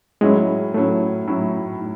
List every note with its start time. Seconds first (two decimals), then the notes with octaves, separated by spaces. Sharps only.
0.21 A2 F#3 G#3 C#4 E4
0.74 A2 F#3 A3 C#4 E4
1.28 A2 F#3 C#4 E4
1.81 A2